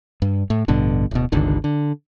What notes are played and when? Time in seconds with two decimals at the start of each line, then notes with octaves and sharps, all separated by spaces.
0.22 G2
0.50 A2
0.68 A1 G2 B2 D3
1.11 D1 B2
1.32 G1 C#2 D3 D#3
1.64 D3